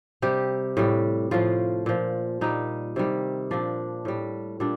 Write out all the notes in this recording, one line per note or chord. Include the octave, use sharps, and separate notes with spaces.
C3 G3 G4
A2 G3
A2 F3 F4
A#2 F3
A#2 G3 D#4
C3 D#3 G3
A#2 F3 D4
A2 G3
A#2 G3 D4